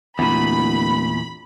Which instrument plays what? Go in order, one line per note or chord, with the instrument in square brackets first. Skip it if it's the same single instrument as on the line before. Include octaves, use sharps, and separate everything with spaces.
[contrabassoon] D1 [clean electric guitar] E2 A#2 [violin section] B5